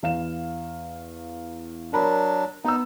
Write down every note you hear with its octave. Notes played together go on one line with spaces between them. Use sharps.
E2 F5 E7
F#3 D4 A#4 A#5 B5
B3 D#4 E6